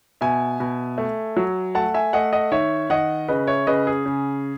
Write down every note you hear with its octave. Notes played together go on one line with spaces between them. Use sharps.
B2 E5 G#5
B2
A3
F#3
A3 F#5 A5
E5 G#5
A3 D#5 F#5
D#5 F#5
D#3 C#5 E5
D#3 D#5 F#5
C#3 B4 D#5
C#5 E5
C#3 B4 D#5
G#4
C#3